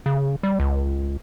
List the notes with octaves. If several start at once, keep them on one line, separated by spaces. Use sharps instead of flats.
C#3
G3
C#2